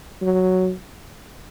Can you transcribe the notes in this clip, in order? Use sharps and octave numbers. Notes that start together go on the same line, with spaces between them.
F#3